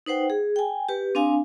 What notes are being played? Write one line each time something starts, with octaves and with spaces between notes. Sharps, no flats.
D#4 B4 C5 F#5 G5
G#4
G5 G#5
G4 B4
C4 D4 F5 G#5